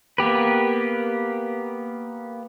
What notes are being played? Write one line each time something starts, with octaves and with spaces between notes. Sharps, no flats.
A#3 B3 G4 B4